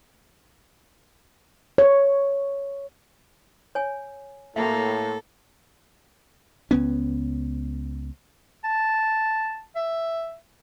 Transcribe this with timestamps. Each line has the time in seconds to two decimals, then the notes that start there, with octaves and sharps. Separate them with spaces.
1.78 C#5
3.75 C#5 G#5
4.56 A2 A#3 F#4 A4 E5
6.71 C#2 B3 C#4
8.64 A5
9.75 E5